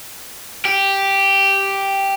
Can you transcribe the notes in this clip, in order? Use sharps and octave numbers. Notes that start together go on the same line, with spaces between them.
G4